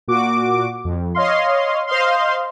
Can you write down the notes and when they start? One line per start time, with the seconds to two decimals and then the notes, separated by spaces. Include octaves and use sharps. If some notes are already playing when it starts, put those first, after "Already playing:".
0.08 A#2 F#4 D6
0.85 F2
1.15 C#5 D#5 F5 C6
1.87 C5 D#5 F5 C6